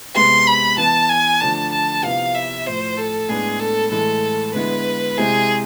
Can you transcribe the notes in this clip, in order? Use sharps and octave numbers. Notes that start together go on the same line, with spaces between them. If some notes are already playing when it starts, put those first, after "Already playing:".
C3 G#3 B3 C6
B5
E3 B3 E4 A5
G#5
D3 F3 A3 D4 A5
A5
C3 F3 B3 E4 F5
E5
A2 F3 A3 C5
A4
A2 G#3 B3 D4 G#4
A4
A2 E3 G#3 A4
D3 G#3 B3 E4 B4
C3 G#3 C4 E4 G#4